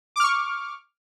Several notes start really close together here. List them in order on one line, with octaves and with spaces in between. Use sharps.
D6 F6 C#6